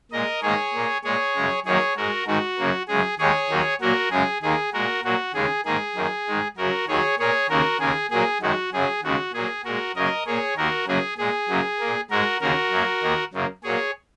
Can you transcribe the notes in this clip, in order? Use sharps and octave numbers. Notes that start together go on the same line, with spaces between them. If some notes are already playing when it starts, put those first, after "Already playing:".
A#2 G#3 A#4 D#5
G#2 D#3 A#3 G#4 C#5
A#2 A#3
A#2 G#3 G#4 C#5
F#2 C#3 G#3
F#2 D#3 F#3 A#3 G#4 C#5
G#2 G#3 F#4 A#4
G#2 D#3 G#3 F#4
F#2 C#3 A#3
F#2 C#3 G#3 G#4
D#2 D#3 G#3 G#4 C#5
D#2 D#3 F#3 A#3
A#2 F#3 A#3 F#4 A#4
F#2 C#3 G#3 G#4
D#2 D#3 A#3 G#4
A#2 G#3 F#4 A#4
A#2 F#3 A#3 F#4
D#2 C#3 G#3 G#4
G#2 D#3 A#3 G#4
F#2 D#3 A#3
G#2 D#3 G#3
F#2 C#3 F#3 F#4 A#4
D#2 D#3 F#3 G#4 C#5
A#2 A#3 G#4 C#5
D#2 C#3 A#3 F#4 A#4
D#2 C#3 A#3 G#4
A#2 F#3 A#3 G#4
F#2 D#3 G#3 F#4
F#2 C#3 F#3 G#4
D#2 C#3 G#3 F#4
A#2 F#3 A#3 G#4
A#2 G#3 F#4 A#4
F#2 C#3 F#3 A#3 A#4 D#5
A#2 A#3 G#4 C#5
D#2 D#3 A#3 F#4 A#4
F#2 C#3 F#3 A#3 G#4
A#2 G#3 G#4
F#2 C#3 F#3 A#3
A#3
A#2
G#2 G#3 F#4 A#4
D#2 C#3 A#3 F#4 A#4
F#2 F#3 A#3
D#2 D#3 A#3
F#2 C#3 A#3
A#2 F#3 A#3 G#4 C#5